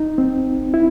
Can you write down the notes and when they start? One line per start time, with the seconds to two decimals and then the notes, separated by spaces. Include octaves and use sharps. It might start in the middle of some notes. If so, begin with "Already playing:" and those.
Already playing: D#4
0.18 C4
0.74 E4